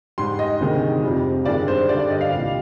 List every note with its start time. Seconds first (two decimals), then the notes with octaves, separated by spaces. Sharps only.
0.18 G#2 G3 C6
0.39 D#5
0.60 D2 C3 D#3 G#3
1.04 F2 C3 G3
1.45 G2 D#3 G#3 D5
1.68 C5
1.88 G2 D3 G3 D5
1.99 D5
2.10 D#5
2.21 F5
2.32 C2 A#2 G3